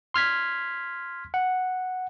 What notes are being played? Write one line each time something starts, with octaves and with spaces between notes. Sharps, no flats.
C6 F6 G#6 B6
F#5